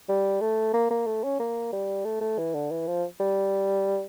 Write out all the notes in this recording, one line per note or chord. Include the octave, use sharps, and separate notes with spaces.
G3
A3
A#3
A#3
A3
C#4
A#3
G3
A3
A3
E3
D3
E3
F3
G3